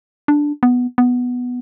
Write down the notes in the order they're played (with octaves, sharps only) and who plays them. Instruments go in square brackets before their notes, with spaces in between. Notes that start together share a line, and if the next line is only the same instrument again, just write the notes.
[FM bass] D4
B3
B3